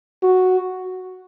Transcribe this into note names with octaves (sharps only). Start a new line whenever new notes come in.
F#4